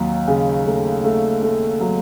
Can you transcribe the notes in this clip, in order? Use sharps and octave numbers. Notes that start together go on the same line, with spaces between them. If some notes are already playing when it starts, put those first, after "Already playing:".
Already playing: D#2 F#3
C#3
A3
A3
A3
F#3